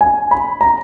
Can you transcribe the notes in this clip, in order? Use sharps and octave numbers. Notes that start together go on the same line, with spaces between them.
G#5
B5
A#5